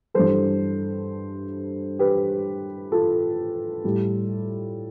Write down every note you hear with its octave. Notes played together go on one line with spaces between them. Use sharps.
G2 E3 G3 A4 C5
G4 B4
F4 A4
A2 G3